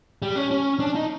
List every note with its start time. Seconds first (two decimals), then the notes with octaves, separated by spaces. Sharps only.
0.22 G3
0.36 C#4
0.51 C#4
0.80 D4
0.95 D#4